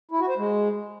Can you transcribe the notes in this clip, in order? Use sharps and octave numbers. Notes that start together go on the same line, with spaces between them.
E4
F#4
C5
G#3